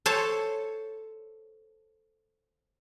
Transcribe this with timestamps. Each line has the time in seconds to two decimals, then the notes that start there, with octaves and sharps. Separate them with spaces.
0.06 A4 C5 C#5 A5